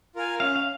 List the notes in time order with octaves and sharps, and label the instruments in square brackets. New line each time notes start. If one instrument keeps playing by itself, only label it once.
[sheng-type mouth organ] F4 A#4 F5 G#5
[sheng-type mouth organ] C#4 [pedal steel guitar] F5
[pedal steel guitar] F5